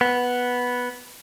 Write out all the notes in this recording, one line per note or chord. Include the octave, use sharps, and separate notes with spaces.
B3